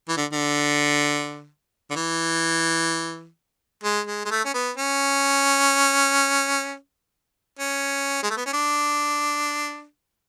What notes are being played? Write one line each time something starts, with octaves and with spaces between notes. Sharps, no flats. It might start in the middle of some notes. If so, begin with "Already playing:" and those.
E3
D3
D3
D3
E3
G#3
G#3
G#3
A3
C#4
B3
C#4
C#4
G#3
A3
B3
C#4
D4